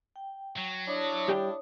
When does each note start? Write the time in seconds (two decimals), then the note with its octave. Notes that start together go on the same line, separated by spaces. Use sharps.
0.16 G5
0.57 F#3
0.87 D4 E4 C#5 D#6
1.28 G3 G4 G5